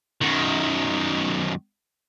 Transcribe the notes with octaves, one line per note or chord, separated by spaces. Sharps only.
F#2 D#3